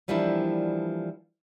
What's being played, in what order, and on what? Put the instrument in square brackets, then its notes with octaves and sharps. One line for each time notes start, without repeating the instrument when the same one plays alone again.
[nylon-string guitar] E3 F3 G3 A#3 D4 E4